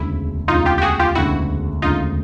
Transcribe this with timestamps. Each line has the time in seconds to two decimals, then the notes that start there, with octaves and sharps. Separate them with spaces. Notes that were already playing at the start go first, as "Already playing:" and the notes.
Already playing: E1 D2 C#3 E4
0.48 E1 D2 C#3 D#4 F4
0.65 F4 G4
0.78 G4
0.82 F#4 G#4
0.99 F4 G4
1.15 E1 D2 C#3 E4 F#4
1.82 E1 D2 C#3 D#4 F4